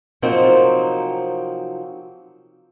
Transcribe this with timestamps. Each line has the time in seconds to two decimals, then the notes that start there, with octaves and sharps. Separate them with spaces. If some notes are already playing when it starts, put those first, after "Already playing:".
0.22 C3 F3 F#3 A#3 C4 D#4